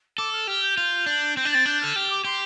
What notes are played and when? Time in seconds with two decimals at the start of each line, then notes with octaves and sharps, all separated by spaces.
0.18 A4 D6
0.33 F6
0.47 G4 F6
0.62 G6
0.77 F4
1.06 D4
1.36 C4 G6
1.45 D4
1.51 C4 A6
1.66 D4 G6
1.81 A4 F6
1.95 G4 F6
2.10 D6
2.24 G4 C6